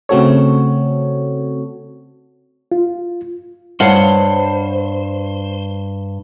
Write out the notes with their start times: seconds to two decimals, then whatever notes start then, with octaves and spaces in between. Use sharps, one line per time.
0.09 C#3 A3 C4 F#4 A4 C#5
2.72 F4
3.80 G2 C5 C#5 F5 F#5